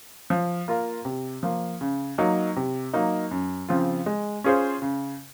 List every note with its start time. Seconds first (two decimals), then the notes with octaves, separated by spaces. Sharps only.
0.30 F3
0.68 A#3 F4 A#4
1.05 C3
1.43 F3 A#3
1.81 C#3
2.18 F#3 A#3 D#4
2.56 C3
2.94 F#3 A#3 D#4
3.31 F#2
3.69 C#3 F3 C4 F4
4.06 G#3
4.44 C#4 F4 G#4 C5
4.82 C#3